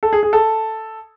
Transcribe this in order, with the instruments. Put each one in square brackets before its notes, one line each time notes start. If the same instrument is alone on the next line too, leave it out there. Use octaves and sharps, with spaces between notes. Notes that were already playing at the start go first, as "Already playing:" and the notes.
[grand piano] A4
G#4
G#4
A4